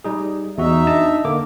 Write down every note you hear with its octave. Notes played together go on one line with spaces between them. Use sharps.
G3 D#4 G#4
E2 D#4 F#4 E5
D4 D#5 A5
D3 A#3 D6